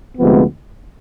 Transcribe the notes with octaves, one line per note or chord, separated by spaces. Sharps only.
D2 C3 F3 G#3 B3